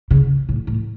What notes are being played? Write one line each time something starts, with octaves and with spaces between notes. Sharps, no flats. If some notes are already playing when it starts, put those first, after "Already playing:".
C#3
A2
A2